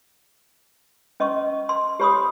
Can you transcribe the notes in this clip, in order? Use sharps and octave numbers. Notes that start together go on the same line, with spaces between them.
C#4 D#5 C6 C#6
C6
G4 C#5 B5 C6 D#6